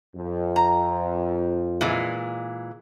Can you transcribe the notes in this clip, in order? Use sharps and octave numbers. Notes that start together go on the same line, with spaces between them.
F2
A#5
A#2 E3 G#3